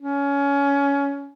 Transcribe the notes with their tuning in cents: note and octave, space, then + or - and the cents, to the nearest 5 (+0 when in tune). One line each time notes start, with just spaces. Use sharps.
C#4 +20